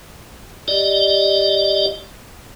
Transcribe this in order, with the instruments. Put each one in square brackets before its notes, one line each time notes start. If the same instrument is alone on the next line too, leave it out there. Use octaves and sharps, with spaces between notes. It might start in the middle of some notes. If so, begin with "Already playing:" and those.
[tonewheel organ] G4 D5 D#5